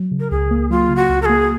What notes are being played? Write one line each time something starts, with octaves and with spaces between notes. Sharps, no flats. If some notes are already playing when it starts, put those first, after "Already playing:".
Already playing: F#3
C#3
A#4
C#2 G#4
A#3
F#3 F4
C#3
F#4
C#2
A#4
A#3 G#4